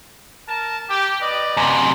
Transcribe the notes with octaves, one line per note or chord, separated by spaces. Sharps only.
A#4 A5
G4
B4 D5 D#5
F#2 C3